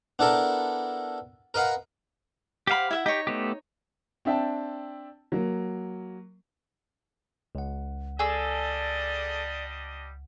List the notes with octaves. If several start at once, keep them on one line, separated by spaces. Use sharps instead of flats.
B3 D4 E4 A4 A#4
A#4 B4 D#5 F5 F#5
G4 C5 F5 F#5 B5
E4 E5 F#5
D#4 G4 C#5
A3 B3 G4
C4 D4 E5 G5 A5
F#3 A#3
C#2 F#5
G3 D4 G#4 A4 D5 D#5 E6